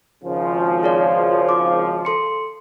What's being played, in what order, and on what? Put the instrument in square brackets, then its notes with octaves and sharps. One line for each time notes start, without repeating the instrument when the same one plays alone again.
[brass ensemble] G#1 C#3 F3
[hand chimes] G#4 C#5 D5
D6
A4 C6 C#7